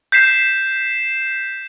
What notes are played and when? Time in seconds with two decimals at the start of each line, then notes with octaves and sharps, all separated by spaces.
0.12 G6 B6 C7 E7